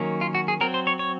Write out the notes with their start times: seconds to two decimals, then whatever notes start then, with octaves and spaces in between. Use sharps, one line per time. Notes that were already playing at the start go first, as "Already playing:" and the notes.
Already playing: D#3 F#3 A#3 C#4
0.21 F4
0.35 F#4
0.48 G#4
0.61 F#3 C4 A#4
0.74 C5
0.87 C#5
0.99 C#5